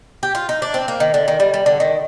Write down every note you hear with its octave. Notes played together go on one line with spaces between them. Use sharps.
G4
F4
D#4
D4
C4
A#3
D#3
D3
D#3
G3
G3
D3
D#3